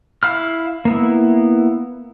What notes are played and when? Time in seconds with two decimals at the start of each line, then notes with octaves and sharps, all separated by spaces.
0.23 E4 F5 B5 F6
0.85 A#3 B3 E4